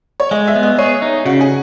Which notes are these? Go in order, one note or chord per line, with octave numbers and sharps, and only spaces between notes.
C#5
G#3 D#5
E5
B3
D#5
G#4 C#5
D#4
C#3 F#4
G#4